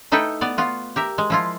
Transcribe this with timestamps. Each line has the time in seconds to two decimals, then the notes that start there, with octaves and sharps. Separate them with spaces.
0.12 A3 D#4 E4 A4 B4 G5
0.41 B3 D5
0.58 B3 F4 F#4
0.96 G4 A#4 E5
1.18 G#3
1.30 F3 E4 F4